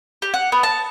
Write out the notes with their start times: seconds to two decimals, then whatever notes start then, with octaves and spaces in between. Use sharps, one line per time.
0.22 G4
0.34 F#5
0.52 B3
0.63 A5